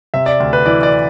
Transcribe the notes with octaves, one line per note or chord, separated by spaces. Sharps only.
C3 E5
D5
D2
B4
E3 D5
D5